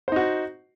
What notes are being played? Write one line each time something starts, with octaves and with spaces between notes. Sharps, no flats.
D#4 F#4 C5